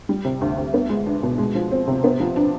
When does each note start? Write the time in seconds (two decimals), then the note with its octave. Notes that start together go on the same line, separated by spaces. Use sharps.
0.09 G3
0.25 C3
0.41 D2
0.58 D2
0.74 B3
0.89 G#3
1.06 D4
1.23 B2
1.38 G#3
1.55 F3
1.71 C4
1.87 C3
2.04 B3
2.20 F3
2.36 D4